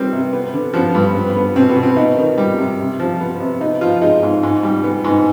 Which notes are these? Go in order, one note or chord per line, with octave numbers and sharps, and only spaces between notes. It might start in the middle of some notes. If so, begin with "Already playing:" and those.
Already playing: D#3 G3 C4 B4
C3
B3
D3
F3 B3
G2
B3
B3
B2 C4
B3
B2
C4
B3 D#4
D#3
G3
C3
C3
F3
B3
C3
B3 D#4
F3 F4
G#3 D#4
G#2
G#2
G3
B3
G#2